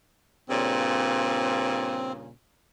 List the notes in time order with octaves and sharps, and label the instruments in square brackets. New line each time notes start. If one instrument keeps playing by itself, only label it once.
[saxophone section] G2 A#2 C#3 [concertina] C4